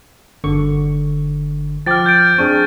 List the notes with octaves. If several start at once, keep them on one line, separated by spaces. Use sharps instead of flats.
G1 D3 C#6
F3 G5 D6 F6 A6
G6 A6 D7
C4 D4 G#4 C#6